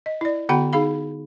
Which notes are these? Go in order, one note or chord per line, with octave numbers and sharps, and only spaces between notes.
D#5
E4 D5
D3 B3 F#4 F#5 G5 B5
D#4 G#4 F5 B5